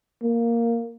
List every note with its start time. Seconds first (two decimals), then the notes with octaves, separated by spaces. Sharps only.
0.22 A#3